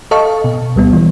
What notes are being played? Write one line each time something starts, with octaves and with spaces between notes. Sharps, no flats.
A4 D#5 F5 A5 C#6
B2
D2 G3 B3
E3